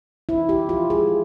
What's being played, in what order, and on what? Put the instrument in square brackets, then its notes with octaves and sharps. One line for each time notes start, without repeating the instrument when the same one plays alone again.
[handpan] E4
G4
F4
G#4